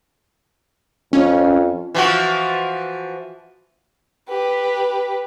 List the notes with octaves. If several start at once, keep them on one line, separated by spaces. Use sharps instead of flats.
F2 C#4
E3 F3 F#4
G4 B4